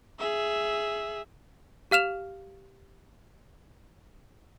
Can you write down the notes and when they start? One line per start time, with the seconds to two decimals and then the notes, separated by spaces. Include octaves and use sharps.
0.19 G#4 E5
1.91 G4 F5 F6 E7 F7